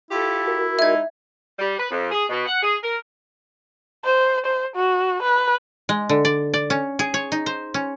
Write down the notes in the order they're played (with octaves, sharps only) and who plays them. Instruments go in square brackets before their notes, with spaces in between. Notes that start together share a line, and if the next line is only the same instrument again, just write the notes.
[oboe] E4 [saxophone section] F4 G4 A4
[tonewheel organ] F#4 A#4
[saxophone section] G#3 D#4 [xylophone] E5 G#6
[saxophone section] G3
B4
F2
G#4
B2
F#5
G#4
A#4
[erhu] C5
C5
F#4
B4
[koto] G#3
D3
D5
D5
C#4
G#4
C#5
D#4
C5
C#4